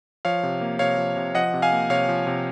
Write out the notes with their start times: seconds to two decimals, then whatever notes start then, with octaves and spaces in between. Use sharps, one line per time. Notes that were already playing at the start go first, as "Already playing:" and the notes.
0.25 F3 C#5 F5
0.43 C3
0.61 A#3
0.79 C3 C#5 F5
0.98 F3
1.17 C3
1.35 F3 D#5 F#5
1.54 C3
1.62 F5 G#5
1.72 A#3
1.90 C3 C#5 F5
2.09 F3
2.27 C3